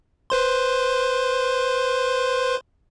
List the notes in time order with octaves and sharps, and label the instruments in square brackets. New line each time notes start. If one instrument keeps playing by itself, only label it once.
[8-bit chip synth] B4 C5 C6